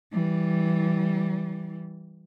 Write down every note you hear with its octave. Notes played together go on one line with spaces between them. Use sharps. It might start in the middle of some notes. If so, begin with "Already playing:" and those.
E3 G3